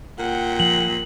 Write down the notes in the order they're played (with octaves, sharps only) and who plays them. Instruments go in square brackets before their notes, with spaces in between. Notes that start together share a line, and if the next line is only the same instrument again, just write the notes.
[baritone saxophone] A#2 [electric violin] F#5 G5
[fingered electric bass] F3 [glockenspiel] F#7